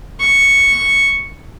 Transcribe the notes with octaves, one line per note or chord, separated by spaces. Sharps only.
C#6